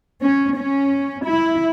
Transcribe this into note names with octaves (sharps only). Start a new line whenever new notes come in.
C#4
C#4
E4